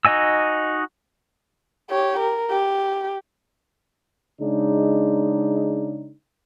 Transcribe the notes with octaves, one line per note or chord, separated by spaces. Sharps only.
D#4 F#4 D#5 G#5 E6
G4 C#5
A#4
G4
C#3 G#3 D4 D#4